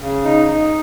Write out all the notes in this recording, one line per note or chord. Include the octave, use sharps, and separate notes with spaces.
C#3
D#4
D#4